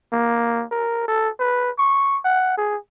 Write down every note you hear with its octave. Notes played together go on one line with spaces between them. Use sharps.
A#3
A#4
A4
B4
C#6
F#5
G#4